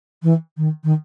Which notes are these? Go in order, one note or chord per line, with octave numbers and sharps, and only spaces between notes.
E3
D#3
D#3